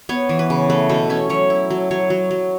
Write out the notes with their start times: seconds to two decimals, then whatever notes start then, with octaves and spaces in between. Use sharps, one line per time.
0.09 B3 C#5
0.29 E3
0.39 B4
0.50 C#3
0.70 A3 B4
0.89 B2 A4
1.10 C#4 E5
1.30 F#3 C#5
1.50 E4
1.70 F#3
1.91 F#3 C#5
2.10 F#3
2.31 F#3